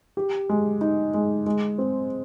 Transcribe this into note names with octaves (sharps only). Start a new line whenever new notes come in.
G4
G#3
D#4
G#3
G#3
C4